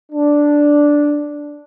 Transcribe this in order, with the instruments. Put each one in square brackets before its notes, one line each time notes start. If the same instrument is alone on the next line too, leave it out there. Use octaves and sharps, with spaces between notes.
[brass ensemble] D4